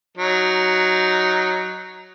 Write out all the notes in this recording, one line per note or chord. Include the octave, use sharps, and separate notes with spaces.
F#3 D#4